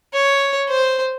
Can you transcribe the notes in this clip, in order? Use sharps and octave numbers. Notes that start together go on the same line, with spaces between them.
C#5
C5